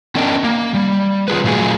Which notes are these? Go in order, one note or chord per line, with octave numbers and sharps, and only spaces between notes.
B3 C#4 D4 A#4 D#5 G5
A#3
G3
D#3 F4 G#4 B4
A#2 F#3 A3 F4 G#4